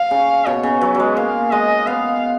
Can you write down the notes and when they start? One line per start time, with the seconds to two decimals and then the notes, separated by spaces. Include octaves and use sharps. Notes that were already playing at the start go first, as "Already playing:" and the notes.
Already playing: F5
0.11 C#3
0.46 B2 C#5
0.63 C#3
0.81 F#3 B4
0.95 F#3
1.00 G#3
1.16 A#3 F5
1.51 G#3 D#5
1.87 B3 F5